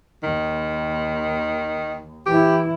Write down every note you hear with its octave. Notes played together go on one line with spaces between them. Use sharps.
D#2 D#3
E3 E4 G4